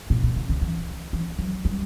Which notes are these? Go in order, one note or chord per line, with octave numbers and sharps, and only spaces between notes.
A#2
B2
C#3
D3
E3
E3
F#3
G3